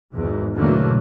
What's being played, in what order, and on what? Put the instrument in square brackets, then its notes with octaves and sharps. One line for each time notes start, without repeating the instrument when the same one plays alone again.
[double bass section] G#1 E2 G#2
E2 B2 D3 F#3 A3 A#3